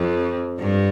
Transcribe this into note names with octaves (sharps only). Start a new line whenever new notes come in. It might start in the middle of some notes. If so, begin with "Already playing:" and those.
Already playing: F2
G2